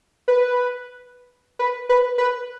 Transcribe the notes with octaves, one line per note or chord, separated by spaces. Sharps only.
B4
B4
B4
B4